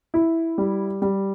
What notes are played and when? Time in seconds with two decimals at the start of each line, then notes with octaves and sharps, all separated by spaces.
0.14 E4
0.58 G3
1.02 G3